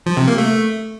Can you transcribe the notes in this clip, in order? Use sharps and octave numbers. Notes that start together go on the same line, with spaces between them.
F3
C3
A#3
A3